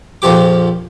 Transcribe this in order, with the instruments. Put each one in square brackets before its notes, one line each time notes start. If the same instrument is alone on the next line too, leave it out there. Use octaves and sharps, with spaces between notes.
[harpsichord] A#1 F2 F3 G4 D6